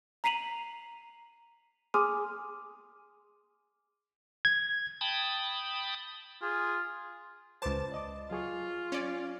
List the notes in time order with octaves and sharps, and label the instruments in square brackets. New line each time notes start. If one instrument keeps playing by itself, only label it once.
[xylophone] A#5 B6 C7 D#7 F7 F#7
G#4 G#5 C6 D6 D#6 F6
[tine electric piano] G#6
[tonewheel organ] G5 A5 B5 D#6
[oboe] F4 [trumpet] G#4
[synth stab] C#2 A5 [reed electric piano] B4 C5 D6
[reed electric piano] D5 D#5 D6
[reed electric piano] F#3 G#4 C#6 [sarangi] F4
[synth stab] C#4 D5